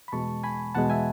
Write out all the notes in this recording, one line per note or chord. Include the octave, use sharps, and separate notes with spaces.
B5
E2 B2 G#3 A5 C#6
G#5 B5
E2 B2 G#3 F#5 A5
E5 G#5